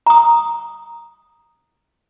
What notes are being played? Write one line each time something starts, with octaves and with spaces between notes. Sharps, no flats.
A#5 D#6